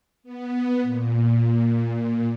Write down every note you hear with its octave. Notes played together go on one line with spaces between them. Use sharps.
B3
A#2